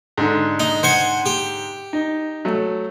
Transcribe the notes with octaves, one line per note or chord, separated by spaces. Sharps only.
G#2 D3
D#4
C5 F#5 G#5
G4
D#4
F#3 A3